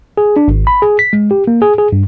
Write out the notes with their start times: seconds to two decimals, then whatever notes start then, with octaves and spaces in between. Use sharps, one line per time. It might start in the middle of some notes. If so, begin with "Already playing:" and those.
0.18 G#4
0.36 D4
0.48 G#1
0.67 B5
0.82 G#4
0.99 B6
1.13 G#3
1.31 G4
1.47 A#3
1.62 G#4
1.78 G#4
1.93 G2